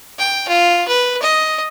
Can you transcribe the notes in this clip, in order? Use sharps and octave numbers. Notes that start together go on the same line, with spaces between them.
G5
F4
B4
D#5